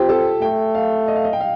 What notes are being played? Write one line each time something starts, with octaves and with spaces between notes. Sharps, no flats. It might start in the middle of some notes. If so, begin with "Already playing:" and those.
Already playing: C4 F4 G4
A4
A3 G5
F5
D#5
F5
D#5
G5
F5